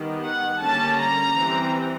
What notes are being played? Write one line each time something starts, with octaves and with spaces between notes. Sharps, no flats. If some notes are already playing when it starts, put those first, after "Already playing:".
Already playing: D#3 G3 B3
F#5
D3 G3 A#3 C#4 A5
A#5
E3 G3 C4